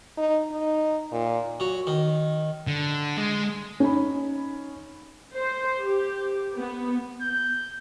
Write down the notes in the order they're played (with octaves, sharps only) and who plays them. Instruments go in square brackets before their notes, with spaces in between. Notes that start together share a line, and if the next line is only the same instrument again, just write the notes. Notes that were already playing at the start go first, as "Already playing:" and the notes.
[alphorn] D#4
D#4
A#2
[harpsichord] F#3
D#3
[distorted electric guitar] D3
G#3
[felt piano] C#4 D#4 B5
[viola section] C5
G4
B3
[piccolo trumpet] G6